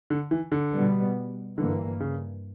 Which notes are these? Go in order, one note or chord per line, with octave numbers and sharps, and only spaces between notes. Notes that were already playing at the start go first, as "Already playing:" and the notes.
D3
E3
D3
B2 G3 B3
G2 D3 E3 A#3
C#3